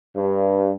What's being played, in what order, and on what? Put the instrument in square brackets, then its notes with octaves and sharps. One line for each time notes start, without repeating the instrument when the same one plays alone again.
[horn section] G2